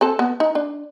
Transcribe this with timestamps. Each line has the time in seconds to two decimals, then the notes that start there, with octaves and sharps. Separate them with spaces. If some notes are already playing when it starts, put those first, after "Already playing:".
0.01 C4 A4 A5
0.19 B3
0.40 D#4
0.55 D4